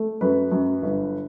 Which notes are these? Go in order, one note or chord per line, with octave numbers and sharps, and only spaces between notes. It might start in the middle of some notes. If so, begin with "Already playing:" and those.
Already playing: A3
F#2 B4
F#2
G1